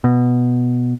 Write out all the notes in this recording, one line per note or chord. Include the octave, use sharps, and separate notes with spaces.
B2